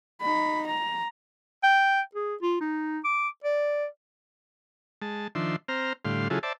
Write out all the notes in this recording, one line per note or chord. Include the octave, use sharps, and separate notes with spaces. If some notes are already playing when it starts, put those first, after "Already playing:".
D#4 B5
A#5
G5
G#4
F4
D#4
D6
D5
G#3 A5
D#3 F3 D4 E5 C6
C4 C5 A#5 F6
A2 D3 G3 F5 C6
C#3 F#3 E4 F4 G#4 A4
C5 D5 E5 A5